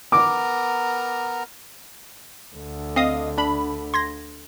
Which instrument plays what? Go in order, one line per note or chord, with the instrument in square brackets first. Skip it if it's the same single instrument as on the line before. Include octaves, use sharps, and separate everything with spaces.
[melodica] B3 A#4 A#5 [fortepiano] D6
[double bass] D2 D3
[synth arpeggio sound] C4 [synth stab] D#5 F5 D#6
[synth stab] D4 B5
[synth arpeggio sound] C6 G#6 A#6